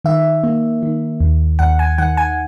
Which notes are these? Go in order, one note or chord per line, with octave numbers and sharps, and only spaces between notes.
D#3 E5
A#3
D#3
D#2
D#2 F#5
G#5
D#3 F#5
G#5